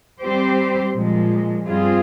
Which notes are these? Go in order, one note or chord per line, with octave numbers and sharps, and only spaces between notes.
G3 C4 G4 C5
A#2 F3 G#3
G2 G3 C4 F4 G#4